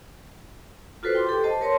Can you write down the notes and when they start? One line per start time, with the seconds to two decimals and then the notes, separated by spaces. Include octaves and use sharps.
1.03 F4 F#4 A4 B4 C5
1.15 G5 C6 D6
1.27 G4 A4
1.43 C5 D#5 A5
1.61 A#4 B4 C#5 A5 C6